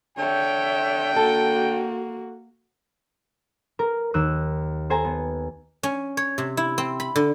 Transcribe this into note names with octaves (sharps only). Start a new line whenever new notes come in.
D3 C#5 E5 G5
A#3 F#4 A4
A#4
D#2 A#4 E6 F#6 D#7
A4 C5 G#5 A#5 C6
B3
C#4
C#5
C3
E4
C4
B5
D3